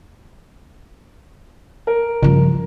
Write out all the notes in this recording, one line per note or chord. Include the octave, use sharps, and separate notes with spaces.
A#4
G2 C#3 F3